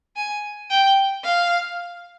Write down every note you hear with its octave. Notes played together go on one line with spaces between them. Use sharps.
G#5
G5
F5